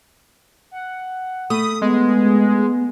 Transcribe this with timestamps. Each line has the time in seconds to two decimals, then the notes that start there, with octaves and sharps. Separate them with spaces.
0.71 F#5
1.50 A3 B5 D#6
1.82 G#3 B3